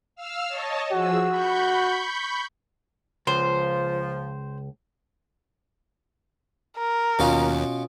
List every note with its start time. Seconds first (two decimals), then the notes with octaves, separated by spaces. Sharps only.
0.16 F5 E6 F6
0.48 C#5 D#5 A5
0.92 F3 F#4 G#4 E6
1.29 B5 C#6 G6
3.27 C#2 F3 C5
6.78 A#4
7.19 D#2 B2 C#4 F4